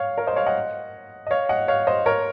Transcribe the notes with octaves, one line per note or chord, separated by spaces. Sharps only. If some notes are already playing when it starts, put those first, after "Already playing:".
Already playing: C#5 F5
A#4 C#5
C5 D#5
C#5 F5
D#5 F#5
D#5
C#5 F5
D#5 F#5
C#5 F5
C5 D#5
A#4 C#5